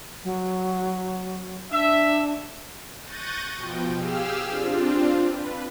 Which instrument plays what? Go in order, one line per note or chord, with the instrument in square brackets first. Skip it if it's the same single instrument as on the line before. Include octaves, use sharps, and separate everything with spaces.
[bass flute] F#3
[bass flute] D4 [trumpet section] E5
[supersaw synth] C#6 F#6 G6 A6 A#6 D#7
B2 F3 G5
G4 G#4 F5 E6 F6
C4 D4 F4
B4